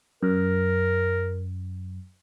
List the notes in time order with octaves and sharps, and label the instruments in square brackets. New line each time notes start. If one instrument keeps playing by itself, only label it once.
[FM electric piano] F#2 [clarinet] A#4